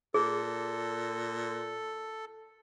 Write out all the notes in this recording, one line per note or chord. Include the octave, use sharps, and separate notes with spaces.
A#2 G#4 A4